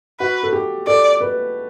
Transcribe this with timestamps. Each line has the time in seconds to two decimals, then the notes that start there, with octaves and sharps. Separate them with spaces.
0.20 F#4 B4
0.43 A4
0.53 G4
0.87 A4 D5
1.21 B4